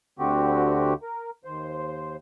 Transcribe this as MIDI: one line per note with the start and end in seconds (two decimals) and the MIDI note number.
0.19 0.94 38
0.19 0.94 50
0.19 0.94 60
0.19 0.94 66
0.19 0.94 67
1.02 1.30 70
1.44 2.16 39
1.44 2.16 72